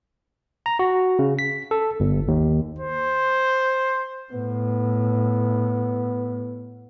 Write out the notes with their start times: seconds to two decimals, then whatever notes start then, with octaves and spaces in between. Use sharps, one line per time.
0.66 A#5
0.79 F#4
1.19 C#3
1.39 B6
1.71 A4
2.00 G1
2.28 D#2
2.79 C5
4.32 A2 B3